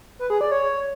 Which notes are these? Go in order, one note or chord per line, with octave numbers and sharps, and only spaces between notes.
B4
G#4
D5
C#5